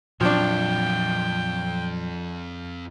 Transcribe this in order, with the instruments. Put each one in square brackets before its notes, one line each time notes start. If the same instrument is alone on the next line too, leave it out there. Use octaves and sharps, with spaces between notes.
[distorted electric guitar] F2 C#5 [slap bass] A#2 F#3 [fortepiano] F3 D4 [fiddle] G5